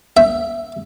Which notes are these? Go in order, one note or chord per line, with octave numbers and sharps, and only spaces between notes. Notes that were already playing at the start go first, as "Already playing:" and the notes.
E5